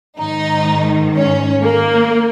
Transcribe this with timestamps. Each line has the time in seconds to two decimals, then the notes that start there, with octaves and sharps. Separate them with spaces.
0.18 G#2 D#3 D#4
1.16 C#4
1.64 A#3